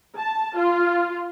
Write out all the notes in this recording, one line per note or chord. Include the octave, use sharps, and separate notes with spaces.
A5
F4